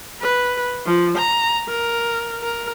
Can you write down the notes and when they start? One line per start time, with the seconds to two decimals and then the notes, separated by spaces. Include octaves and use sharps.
0.21 B4
0.86 F3
1.18 A#5
1.68 A#4
2.43 A#4